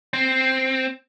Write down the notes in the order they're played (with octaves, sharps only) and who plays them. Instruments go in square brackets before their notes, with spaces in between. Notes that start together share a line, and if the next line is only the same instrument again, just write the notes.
[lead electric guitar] C4